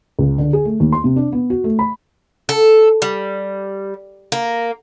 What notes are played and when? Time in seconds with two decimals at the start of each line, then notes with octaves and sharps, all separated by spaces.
0.19 C#2
0.38 D3
0.53 G#4
0.65 A3
0.80 D#2
0.92 C6
1.04 C3
1.16 D4
1.32 B3
1.50 F#4
1.64 A3
1.79 B5
2.49 A4
3.02 G3
4.32 A#3